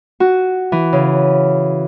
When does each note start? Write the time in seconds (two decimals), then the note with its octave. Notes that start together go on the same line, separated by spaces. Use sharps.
0.20 F#4
0.72 E3
0.93 C#3